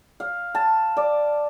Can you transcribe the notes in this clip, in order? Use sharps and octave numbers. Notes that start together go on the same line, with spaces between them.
F5
A5
D5